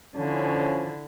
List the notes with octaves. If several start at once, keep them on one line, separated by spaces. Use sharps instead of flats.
D3 F3 C#4 E4